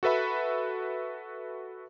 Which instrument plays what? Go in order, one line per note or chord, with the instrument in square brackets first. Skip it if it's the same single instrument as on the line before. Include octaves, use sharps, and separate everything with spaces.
[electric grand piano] F#4 A4 B4 E5 B5